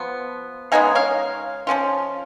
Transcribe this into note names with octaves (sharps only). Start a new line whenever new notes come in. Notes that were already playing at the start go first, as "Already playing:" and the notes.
Already playing: F3 B3
C#3 G#3 B3 D#4 F5 G#5
C#5 F5
F3 G#3 C#4 F4